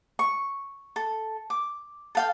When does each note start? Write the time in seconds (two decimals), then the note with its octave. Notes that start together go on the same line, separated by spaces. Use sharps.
0.19 C#6
0.96 A4
1.50 D6
2.15 A4 F5 G5